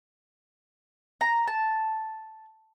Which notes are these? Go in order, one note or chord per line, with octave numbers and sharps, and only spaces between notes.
A#5
A5